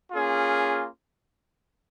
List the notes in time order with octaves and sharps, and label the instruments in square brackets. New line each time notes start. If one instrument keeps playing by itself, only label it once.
[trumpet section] A#3 C#4 F4 G#4